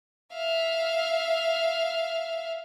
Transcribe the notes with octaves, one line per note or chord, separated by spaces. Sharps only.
E5 F5